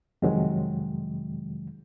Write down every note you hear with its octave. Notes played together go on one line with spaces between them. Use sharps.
F2 C3 D#3 F#3 G#3